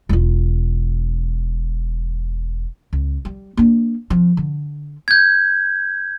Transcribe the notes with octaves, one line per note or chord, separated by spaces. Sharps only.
E1 F4
C#2
G3
A#3 D4
F3 C4
D3
G6 G#6